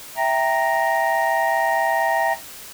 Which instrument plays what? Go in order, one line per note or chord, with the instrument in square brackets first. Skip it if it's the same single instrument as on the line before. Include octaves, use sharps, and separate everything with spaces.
[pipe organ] E5 G5 A#5 A#6